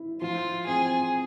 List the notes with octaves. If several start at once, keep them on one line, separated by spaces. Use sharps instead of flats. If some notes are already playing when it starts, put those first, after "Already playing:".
Already playing: E4
F3 F4
C4 G#4